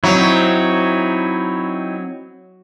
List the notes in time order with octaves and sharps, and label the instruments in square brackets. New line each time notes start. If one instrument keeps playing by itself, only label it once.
[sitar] F#3 [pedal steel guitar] C4 D#4 E4